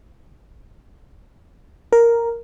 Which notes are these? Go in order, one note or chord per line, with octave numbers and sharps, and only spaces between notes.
A#4